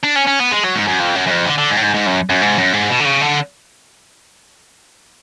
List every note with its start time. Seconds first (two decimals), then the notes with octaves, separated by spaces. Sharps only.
0.04 D4
0.16 C#4
0.28 C#4
0.40 B3
0.52 G#3
0.64 F#3
0.75 G#2
0.87 F#2
1.00 F2
1.15 F#2
1.27 F#2
1.31 F2
1.46 D3
1.58 D3
1.70 G#2
1.77 A2
1.82 G#2
1.94 G#2
2.06 F#2
2.30 F#2
2.42 G#2
2.58 F#2
2.73 G#2
2.89 B2
3.00 D3
3.05 C#3
3.21 D3